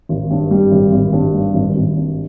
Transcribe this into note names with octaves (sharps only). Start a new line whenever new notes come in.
G#1
G2
G3
G#1
G#1
G2
G3
G#1
G#1
G2